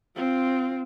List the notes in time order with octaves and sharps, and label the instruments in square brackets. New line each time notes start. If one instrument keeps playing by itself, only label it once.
[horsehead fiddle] C4 F4